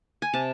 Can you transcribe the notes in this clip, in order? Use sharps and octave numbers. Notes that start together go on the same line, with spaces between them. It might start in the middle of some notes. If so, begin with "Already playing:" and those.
G#5
C3 A5